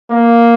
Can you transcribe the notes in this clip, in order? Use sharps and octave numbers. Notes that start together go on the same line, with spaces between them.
A#3